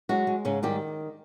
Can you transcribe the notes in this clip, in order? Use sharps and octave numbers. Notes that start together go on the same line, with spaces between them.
F#3 G#3 F#4
G#3
G#2 C#3 C#4
D#3 G3 G4